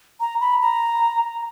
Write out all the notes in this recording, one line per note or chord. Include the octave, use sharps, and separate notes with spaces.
A#5
B5
A#5